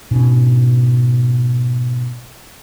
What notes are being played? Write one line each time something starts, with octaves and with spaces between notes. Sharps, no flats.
G#2 B2 C#4 D4